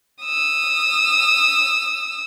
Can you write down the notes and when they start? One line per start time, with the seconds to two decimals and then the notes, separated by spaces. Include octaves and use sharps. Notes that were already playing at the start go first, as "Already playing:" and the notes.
0.24 D#6 E6